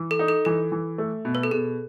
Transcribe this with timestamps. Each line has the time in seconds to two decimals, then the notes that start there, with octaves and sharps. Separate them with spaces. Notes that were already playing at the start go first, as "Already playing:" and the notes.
Already playing: E3
0.11 A4
0.19 D#4
0.28 A4
0.45 E3 A4
0.72 E3
0.98 A3
1.25 B2
1.35 B4
1.43 A4
1.51 B2 G#4